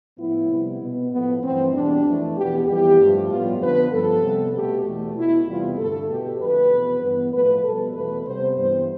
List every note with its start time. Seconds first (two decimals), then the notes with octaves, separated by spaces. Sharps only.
0.18 A2 F3 B3 E4
0.49 C3 G3 B3
0.80 B2 B3
1.11 A2 F3 A3 B3
1.42 G2 E3 A3 C4
1.73 E2 B2 G3 D4
2.04 F2 E3 A3
2.35 E2 B2 B3 G4
2.66 F2 E3 G3 B3 G4
2.98 G2 F3 A3
3.28 A2 G3 B3 F4
3.59 F2 D3 F3 B3 B4
3.90 G2 F3 B3 A4
4.22 C3 G3 B3
4.53 B2 A3 G4
4.84 E2 B2 A3
5.14 B2 B3 E4
5.46 E2 C3 G3 B3 F4
5.77 G2 D3 A3 A4
6.08 B2 B3 G4
6.39 F2 D3 A3 B4
6.70 E2 B2 B3
7.02 G2 E3 B3
7.32 A2 F3 A3 B4
7.63 B2 G3 B3 A4
7.94 E2 B2 A3 B4
8.26 C3 G3 B3 C5
8.56 G2 E3 G3 B3 C5